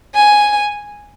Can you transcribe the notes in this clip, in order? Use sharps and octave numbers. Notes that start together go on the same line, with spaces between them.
G#5